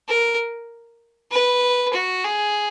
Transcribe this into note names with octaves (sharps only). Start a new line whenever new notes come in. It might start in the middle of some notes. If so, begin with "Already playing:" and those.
A#4
B4
F#4
G#4